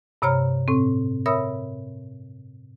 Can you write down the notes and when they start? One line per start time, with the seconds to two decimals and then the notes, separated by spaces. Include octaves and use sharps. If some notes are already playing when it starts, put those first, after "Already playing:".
0.22 G2 C3 C#5 A#5 F6
0.68 A2 C4
1.26 A#4 C#5 E5 B5 D#6 E6